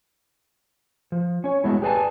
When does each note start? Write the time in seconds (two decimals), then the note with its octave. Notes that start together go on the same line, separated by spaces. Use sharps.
1.12 F3
1.44 C#4 C#5
1.64 F#3 G#3 A3 B3 E4
1.82 G4 G#4 B4 D5 G#5 A5